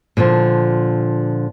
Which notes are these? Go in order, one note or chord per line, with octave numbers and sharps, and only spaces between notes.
A#2 D3 E3 F3